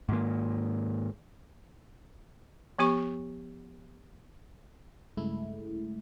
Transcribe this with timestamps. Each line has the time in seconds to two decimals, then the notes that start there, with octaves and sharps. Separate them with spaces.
0.09 G#2 D#3 A#3
2.79 F3 B3 G4 C#6
5.17 G2 C#3 G#3 A3 E4